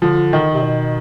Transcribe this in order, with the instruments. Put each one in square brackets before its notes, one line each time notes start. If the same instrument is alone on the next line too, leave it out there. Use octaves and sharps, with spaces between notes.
[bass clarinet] D3 [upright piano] F3
[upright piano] D#3
[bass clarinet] C3
B2